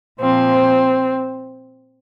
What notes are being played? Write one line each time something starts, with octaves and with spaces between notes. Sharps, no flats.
A#2 F3 C4